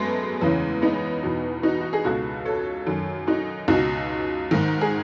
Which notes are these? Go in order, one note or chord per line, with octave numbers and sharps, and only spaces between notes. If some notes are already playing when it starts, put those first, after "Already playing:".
Already playing: F#2 G#3 A3 B3
E2 C#3 E3
B3 D#4
E2 B2
D#4 F#4
F#4
G#4
C#2 B2 F#4 A4
A4 C#5
F#2 D#3
D#4 F#4
C#2 D#4 F#4
B2
G#2 D#3
G#4